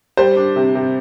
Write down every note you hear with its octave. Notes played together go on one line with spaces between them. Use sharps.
G3 C5
D4
C3
C3